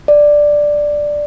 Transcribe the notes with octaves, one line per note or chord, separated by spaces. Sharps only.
D5